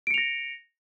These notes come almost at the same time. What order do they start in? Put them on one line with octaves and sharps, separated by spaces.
D7 C#7 F7 A#6